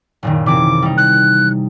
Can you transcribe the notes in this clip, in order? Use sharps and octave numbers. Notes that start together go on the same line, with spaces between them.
F#1 A#2 D#3
C3 E3 C4 D6
G3 D#4
F#6